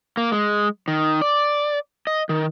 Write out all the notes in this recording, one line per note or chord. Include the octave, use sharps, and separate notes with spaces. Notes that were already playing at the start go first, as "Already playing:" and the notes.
A#3
G#3
D#3
D5
D#5
D#3